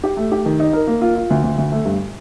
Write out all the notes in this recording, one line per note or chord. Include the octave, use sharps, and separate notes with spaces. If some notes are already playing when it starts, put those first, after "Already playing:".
G4
A3
G4
D#3
D#4
A#4
A#3
F4
F4
D2
D2
D2
A3
G2